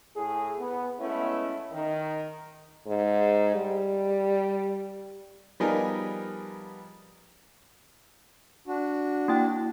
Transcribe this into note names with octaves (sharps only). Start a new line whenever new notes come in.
A2 G#4
B3
G#3 A3 B3 C#4 E4
D#3
G#2
G3
F3 G3 B3 D#4 G#4 A#4
D4 F#4
A#3 E4 G5